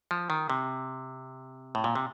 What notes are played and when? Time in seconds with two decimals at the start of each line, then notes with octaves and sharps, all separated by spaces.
0.11 F3
0.30 D#3
0.50 C3
1.75 A2
1.84 A#2
1.95 C3